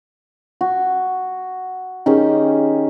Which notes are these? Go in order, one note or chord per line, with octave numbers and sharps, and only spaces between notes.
F#4
D#3 C#4 G4 G#4